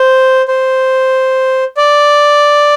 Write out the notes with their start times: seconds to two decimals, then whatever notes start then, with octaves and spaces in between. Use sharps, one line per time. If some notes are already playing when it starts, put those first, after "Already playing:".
Already playing: C5
0.48 C5
1.77 D5